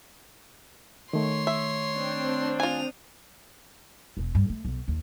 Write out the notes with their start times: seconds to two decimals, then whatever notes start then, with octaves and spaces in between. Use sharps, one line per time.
1.13 D#3 A3 C#5 C6
1.47 E5
1.96 C4 D4
2.60 F4 G#5 D#6 F7
4.17 E1
4.35 G2
4.49 A3
4.65 B1
4.88 D#2